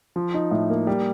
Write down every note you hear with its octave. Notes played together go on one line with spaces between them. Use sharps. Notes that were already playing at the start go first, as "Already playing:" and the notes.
F3
D#4
A2
A#3
G3